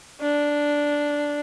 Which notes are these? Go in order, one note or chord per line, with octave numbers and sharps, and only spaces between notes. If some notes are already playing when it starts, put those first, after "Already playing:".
D4